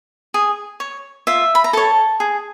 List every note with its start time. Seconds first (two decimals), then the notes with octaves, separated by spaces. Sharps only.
0.34 G#4
0.80 C#5
1.27 F4 E5
1.55 B5
1.64 A#5
1.73 A4 C#5 A5
2.20 G#4